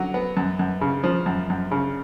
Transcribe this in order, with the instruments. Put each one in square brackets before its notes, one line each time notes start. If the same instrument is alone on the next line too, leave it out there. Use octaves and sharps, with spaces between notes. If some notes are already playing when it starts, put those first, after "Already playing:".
Already playing: [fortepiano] D3 F#3
B3
F#2
F#2
C#3
F3
F#2
F#2
C#3